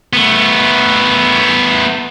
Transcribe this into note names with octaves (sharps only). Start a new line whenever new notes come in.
A3 B3